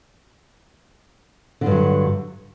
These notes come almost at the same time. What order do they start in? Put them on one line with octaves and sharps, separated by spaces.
D3 G2 F#3